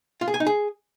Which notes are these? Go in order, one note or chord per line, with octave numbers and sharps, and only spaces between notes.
F4
G#4
G#5
D#4
G#4